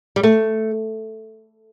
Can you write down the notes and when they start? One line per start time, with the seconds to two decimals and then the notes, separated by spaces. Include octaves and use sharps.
0.16 G3
0.23 A3